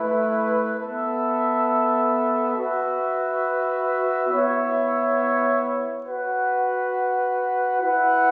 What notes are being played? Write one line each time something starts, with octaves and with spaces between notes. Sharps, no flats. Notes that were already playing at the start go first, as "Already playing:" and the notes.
Already playing: A3 E4 B4
B3 A4 E5
F#4 B4 E5
B3 E4 C#5 E5
F#4 B4 F#5
E4 B4 F#5